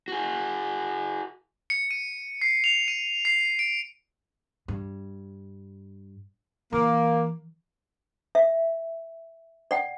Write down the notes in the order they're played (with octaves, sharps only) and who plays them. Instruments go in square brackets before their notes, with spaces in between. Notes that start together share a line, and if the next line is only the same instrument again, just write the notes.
[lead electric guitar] F#4 G#4
[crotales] C#7
D#7
C7
F7
D#7
C7
D7
[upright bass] G2
[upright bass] E3 [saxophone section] A#3
[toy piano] E5
D5 F#5 G5